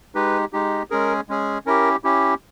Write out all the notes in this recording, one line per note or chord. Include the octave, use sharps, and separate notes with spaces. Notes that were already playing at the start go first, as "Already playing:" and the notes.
G#3 D#4 G4 B4
G#3 D#4 G4
G#3 C#4 G#4 A#4
G#3 C#4 G#4
C#4 E4 G4 A#4
C#4 E4 G4